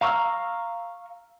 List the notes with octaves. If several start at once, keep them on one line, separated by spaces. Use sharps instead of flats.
F5 A#5 C#6 E6 F6